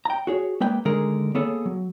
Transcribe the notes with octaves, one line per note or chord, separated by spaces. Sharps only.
G5 A#5
F#4 G#4 C#5
G#3 A#3 B4 G5
D3 D#3 G#3 G#4 A#4
A#3 B3 G#4 A4 C#5
F#3